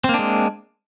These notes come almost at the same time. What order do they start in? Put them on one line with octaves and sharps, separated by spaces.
C4 A#3 D4 G#3